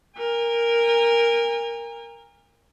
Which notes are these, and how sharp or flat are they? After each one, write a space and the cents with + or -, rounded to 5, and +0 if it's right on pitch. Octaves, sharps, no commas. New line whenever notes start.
A#4 +0 G#5 -40